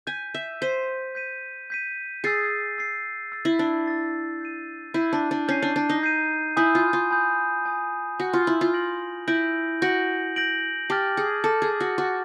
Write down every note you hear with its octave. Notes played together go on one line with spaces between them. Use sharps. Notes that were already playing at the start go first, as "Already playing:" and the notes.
G#5 G6 B6 D#7
E5
C5 G6 B6 D#7
G6 B6 D#7
G6 B6 D#7
G#4 E6 A6 C7
E6 A6 C7
E6 A6 C7
E4
D4
E6 A6 C7
G6 C7 D#7
E4 G6 C7 D#7
D4
D4
C#4 G6 C7 D#7
D4
D4
D#4
G6 C7 D#7
E4 G#5 B5 D#6 G6
F4
F4
G#5 B5 D#6 G6
G#5 B5 D#6 G6
F#4 G#5 B5 D#6 G6
F4
E4
F4
G6 A#6 D7 F#7
E4 G6 A#6 D7 F#7
F#4 G6 A#6 D7 F#7
G6 A#6 D7 F#7
G4 A5 D6 F6 A6
G#4
A4 A5 D6 F6 A6
G#4
F#4
F#4 A5 D6 F6 A6